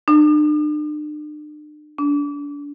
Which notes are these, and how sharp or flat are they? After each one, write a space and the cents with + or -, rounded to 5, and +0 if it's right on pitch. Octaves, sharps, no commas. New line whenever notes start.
D4 +40
D4 -30